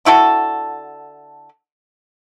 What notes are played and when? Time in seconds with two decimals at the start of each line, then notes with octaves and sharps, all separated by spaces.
0.05 D3 E4 F#4 A4